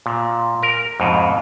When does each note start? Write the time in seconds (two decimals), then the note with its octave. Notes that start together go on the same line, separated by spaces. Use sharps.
0.06 A#2
0.63 A#4
1.00 F2 G#2 B2